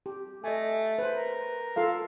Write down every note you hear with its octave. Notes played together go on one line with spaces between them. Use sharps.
G4
A3 D#5 G#5
B4 C5
A#4
F4 A4 F5